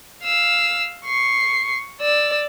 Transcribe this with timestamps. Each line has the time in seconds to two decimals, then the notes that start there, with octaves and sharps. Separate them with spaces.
0.23 F5 E6
1.06 C#6 C7
2.01 D5 E6